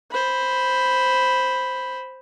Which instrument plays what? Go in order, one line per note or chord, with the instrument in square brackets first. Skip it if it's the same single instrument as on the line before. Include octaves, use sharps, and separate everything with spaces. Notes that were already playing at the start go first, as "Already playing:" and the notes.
[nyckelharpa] C5 B5